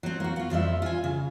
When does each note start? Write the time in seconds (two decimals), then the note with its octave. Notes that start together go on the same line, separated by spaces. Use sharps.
0.03 F#3 C4
0.20 A#3 F#4
0.36 B3 F4
0.50 F2 F3 G3 E5
0.82 F4 G#5
1.04 C#3